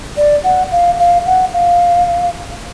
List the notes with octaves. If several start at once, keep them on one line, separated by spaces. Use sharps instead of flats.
D5
F#5
F5
F5
F#5
F5